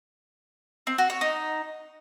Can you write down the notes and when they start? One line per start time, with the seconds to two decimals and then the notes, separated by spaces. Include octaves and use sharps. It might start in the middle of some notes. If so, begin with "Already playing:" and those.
0.87 C4
0.98 F#4
1.10 C#5
1.21 D#4